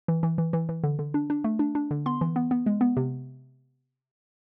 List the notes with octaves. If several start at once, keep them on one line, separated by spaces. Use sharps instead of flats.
E3
E3
E3
E3
E3
D3
D3
D4
D4
A3
D4
D4
D3
B3 C6
E3
B3
B3
G#3
B3
C3